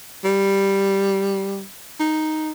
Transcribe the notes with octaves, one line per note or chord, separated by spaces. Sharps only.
G3
D#4